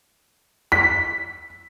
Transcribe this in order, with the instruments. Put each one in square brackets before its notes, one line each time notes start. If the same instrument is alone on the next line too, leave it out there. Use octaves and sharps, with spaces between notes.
[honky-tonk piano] B6